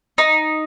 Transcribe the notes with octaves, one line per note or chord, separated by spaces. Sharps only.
D#4